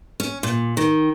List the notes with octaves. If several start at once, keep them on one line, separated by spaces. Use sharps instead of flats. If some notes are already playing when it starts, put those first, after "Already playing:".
C#4
A#2
D#3